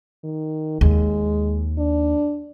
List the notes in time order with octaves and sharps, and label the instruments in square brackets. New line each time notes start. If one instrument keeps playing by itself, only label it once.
[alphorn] D#3
[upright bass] D#2 [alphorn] G#3
[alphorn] D4